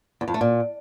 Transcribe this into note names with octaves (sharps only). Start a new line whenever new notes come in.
E2
F2
A3
A#2